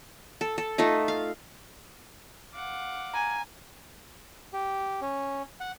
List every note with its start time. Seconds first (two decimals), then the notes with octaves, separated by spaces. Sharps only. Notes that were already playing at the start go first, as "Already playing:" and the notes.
0.41 A4
0.58 A4
0.78 A3 D#4 F4 A4
1.08 F5
2.54 F5 F#5 D6
3.14 G#5 A#5
4.53 G4
5.02 C#4
5.60 F#5